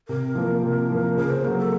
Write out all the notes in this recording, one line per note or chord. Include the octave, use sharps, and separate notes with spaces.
C3 A#4
F3 A#3
C3
F3 A#3
C#3 A#4
C5
F#3 A#3 A#4
A4